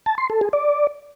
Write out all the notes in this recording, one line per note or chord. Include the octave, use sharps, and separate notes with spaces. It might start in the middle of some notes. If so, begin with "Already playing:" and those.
A5
C6
A4
G#4
D5